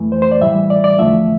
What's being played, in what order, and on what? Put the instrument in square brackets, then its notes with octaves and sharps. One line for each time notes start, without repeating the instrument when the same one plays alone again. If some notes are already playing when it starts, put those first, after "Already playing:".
Already playing: [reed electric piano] F2 E3 A3
C5
C5
D5
A2 E3 G3 E5
D5
D5
E2 D3 F3 A3 E5